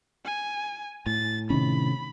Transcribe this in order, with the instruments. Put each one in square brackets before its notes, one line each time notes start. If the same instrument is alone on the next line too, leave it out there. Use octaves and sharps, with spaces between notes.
[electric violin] G#5
[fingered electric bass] A2 [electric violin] A6
[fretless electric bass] C3 D#3 C#4 [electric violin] B5